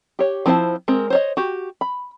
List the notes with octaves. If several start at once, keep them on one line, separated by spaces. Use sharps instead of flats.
G4 C#5
F3 C4 E4 C5 A5
G#3 C4 A#4
C5 C#5 D#5
F#4 G4
B5